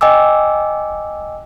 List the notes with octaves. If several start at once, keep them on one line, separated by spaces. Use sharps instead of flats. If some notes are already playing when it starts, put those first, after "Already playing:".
D#5 G5 G#5 D6 E6